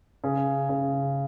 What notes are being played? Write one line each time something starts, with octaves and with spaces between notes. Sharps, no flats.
C#3
C#3